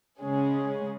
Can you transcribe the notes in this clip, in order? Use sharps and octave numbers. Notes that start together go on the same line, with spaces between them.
C#3 G#3 C#4 G#4